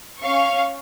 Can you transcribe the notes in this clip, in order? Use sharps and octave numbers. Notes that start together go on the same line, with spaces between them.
C#4 F5 C#6